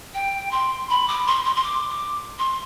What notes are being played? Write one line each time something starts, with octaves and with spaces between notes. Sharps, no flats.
G5
C6
B5
D6
C6
C6
C6
D6
D6
C6